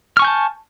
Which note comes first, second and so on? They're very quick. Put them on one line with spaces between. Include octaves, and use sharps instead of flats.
F6 C#6 G#5 G6 A5